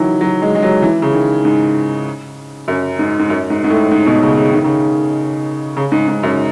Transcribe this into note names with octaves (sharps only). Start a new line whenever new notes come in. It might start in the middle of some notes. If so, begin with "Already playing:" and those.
Already playing: D#3 E3 F#3
F#3
G#3
G#3
F#3
E3
C#3
D#3
G#2
F#2
G#2
G#2
F#2
G#2
G#2
A2
G#2
B2
C#3
C#3
D#3
C#3
C#3
G#2
G#2
F#2